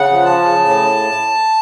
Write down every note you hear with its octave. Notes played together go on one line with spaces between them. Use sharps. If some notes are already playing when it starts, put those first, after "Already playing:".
Already playing: C#3 F#5
F3
A5
C#3
A2